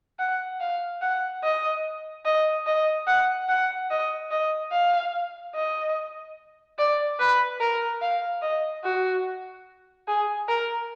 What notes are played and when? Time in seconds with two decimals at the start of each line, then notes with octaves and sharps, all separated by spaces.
0.19 F#5
0.60 F5
1.02 F#5
1.44 D#5
2.25 D#5
2.67 D#5
3.07 F#5
3.49 F#5
3.91 D#5
4.31 D#5
4.72 F5
5.55 D#5
6.78 D5
7.19 B4
7.60 A#4
8.02 F5
8.42 D#5
8.84 F#4
10.08 G#4
10.48 A#4